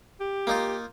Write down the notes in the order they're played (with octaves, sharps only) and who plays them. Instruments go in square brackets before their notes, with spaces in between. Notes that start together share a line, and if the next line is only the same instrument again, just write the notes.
[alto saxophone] G4
[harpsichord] A#3 D#4 F4